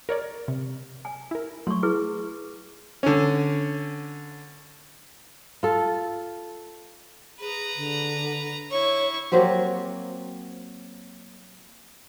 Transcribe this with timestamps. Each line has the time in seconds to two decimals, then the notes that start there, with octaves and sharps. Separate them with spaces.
0.09 A#4 C#5 D5
0.48 C3
1.05 G#5
1.31 E4 A#4
1.67 F#3 A3 C6 C#6
1.83 E4 G#4 B4
3.03 D3 C#4
5.63 F4 A4
7.40 G#4 B4 A#5
7.76 D3
8.71 E4 C#5 C#6
9.32 F#3 A#3 C4 G4